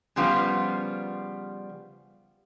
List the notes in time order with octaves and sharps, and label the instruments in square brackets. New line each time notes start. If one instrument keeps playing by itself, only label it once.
[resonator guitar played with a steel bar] C#3 F3 G3 B3 F4